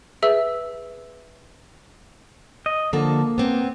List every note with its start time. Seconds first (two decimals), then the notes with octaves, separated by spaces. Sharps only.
0.22 G#4 B4 E5 E6
2.66 D#5
2.93 D3 F3 A#3 A4
3.38 B3 C4